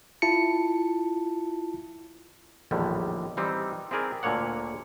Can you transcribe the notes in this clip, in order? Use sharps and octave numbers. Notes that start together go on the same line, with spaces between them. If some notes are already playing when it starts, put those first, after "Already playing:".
E4 F4 A5 C#7
A#1 E2 A2 D3 D#3 G3
E3 G3 C4 D#4
C4 E4 G#4 A#4 D5
D2 A#2 D3 A#3 C#5 F#5